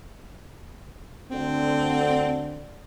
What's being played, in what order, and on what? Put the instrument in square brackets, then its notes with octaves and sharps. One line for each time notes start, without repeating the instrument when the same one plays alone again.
[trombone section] D2 D3 [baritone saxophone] C4